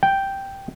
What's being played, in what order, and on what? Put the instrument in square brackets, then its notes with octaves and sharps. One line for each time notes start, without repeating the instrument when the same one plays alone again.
[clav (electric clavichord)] G5